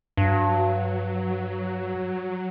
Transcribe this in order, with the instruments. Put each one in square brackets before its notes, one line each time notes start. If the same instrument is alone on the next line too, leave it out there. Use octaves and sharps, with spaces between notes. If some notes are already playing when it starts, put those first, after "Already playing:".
[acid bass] G2 [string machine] F#3